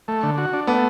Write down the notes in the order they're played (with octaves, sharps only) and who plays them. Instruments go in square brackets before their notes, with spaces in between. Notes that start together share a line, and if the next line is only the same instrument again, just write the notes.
[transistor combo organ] A3
D3
F#4
D4
[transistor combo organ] A3 [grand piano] B3